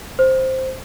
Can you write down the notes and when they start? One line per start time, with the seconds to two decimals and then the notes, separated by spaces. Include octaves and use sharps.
0.19 C5